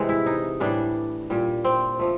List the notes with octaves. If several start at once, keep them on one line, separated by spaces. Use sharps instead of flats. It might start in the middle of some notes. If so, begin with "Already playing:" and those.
Already playing: C3 E3 G#3
E4
D#4
A2 E3 G3 D4
A#2 G3
C4
F3 A3